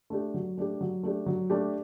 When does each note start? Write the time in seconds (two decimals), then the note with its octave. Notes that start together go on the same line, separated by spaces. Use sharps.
0.10 A3 D4 G4
0.34 F#3
0.57 A3 D4 G4
0.81 F#3
1.03 A3 D4 G4
1.26 F#3
1.50 A3 D4 G4